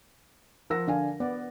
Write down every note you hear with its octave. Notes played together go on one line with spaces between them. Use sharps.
F3 A#4 F#5 E6 A#6
D3 D4 F5 G#5
B3 D5 F#5